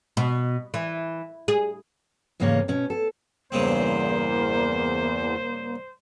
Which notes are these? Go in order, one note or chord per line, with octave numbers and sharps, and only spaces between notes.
B2
E3
G#4
E2 G#2 C#3 A#3 C#4 C#5
B2 C#4
A4
E2 G2 C#3 A#3 C4 C5